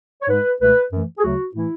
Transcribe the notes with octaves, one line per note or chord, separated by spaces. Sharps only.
C#5
G#2 G#3 B4
C#2 B2 A3 B4
F#2 E3 A3
G#4
D2 C#3 F#3 A3 F#4
A2 E3 A3 E4